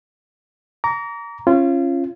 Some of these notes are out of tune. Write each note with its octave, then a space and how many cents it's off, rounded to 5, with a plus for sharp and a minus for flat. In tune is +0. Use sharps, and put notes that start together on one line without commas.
A#5 +0 D6 -45
C#4 -25 F4 -30